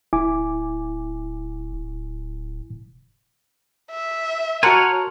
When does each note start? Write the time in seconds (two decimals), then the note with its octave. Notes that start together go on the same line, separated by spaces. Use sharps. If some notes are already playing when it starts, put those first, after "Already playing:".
0.13 D1 E4 G#5 D6
1.73 D1
3.91 E5
4.63 F#4 A#4 C#5 F#5 G#5 A5 C6